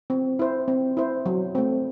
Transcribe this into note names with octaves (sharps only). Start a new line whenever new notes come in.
C4
E4 C5
C4
E4 C5
F#3
A3 C4